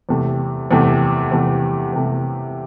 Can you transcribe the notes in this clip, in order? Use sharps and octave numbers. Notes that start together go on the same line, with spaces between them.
E2 C3 A3
E2 C3 A3
E2 C3 A3
E2 C3 A3